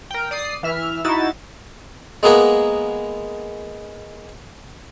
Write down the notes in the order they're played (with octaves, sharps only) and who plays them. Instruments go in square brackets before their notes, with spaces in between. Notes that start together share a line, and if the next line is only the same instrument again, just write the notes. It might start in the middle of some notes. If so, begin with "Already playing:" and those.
[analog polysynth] A#4 G5
D5 D#6 C7
E3 E5 F6
D#4 E4 F#4 A6 E7
[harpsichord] G#3 A#3 B3 G#4 A#4 F#5